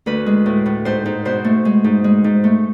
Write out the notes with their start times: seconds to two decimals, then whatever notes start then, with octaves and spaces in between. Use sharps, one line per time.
0.06 D2 B4
0.26 G#3
0.46 A2
0.66 A2
0.85 G#2 C5
1.06 G#2
1.25 B2 C5
1.44 A3
1.65 G#3
1.84 G#2
2.04 G#3
2.24 G#2
2.44 A3